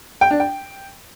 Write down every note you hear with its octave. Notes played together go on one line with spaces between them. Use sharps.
G5
D4
G5